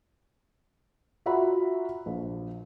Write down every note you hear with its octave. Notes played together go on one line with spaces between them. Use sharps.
F4 F#4 E5 F#5 A#5 B5
A#1